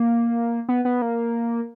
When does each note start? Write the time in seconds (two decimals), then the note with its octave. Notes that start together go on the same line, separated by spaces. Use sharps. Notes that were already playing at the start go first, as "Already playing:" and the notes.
Already playing: A#3
0.69 B3
0.85 B3
1.02 A#3